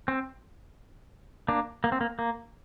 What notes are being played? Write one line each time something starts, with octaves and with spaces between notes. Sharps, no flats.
C4
A#3 D4
A#3
C4
A#3
A#3